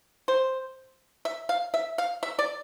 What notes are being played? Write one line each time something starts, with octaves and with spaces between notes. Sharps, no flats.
C5
E5
F5
E5
F5
E5
D5